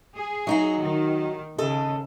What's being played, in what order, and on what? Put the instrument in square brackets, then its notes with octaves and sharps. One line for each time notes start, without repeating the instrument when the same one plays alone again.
[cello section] G#4
[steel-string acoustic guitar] F#3 D#4 F#4
[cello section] D#3
[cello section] C#3 [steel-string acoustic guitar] A4 D#5